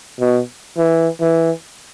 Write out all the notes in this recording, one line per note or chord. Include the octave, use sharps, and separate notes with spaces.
B2
E3
E3